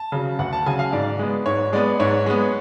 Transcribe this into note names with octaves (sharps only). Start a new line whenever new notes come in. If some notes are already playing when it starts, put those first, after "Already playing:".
Already playing: A5
C#3 F#3
D2 F#5
A5
C#3 F#3 G#5
F5
G#2 D5
G#3 B3
G#2 C#5
G#3 B3 D5
G#2 C#5
G#3 B3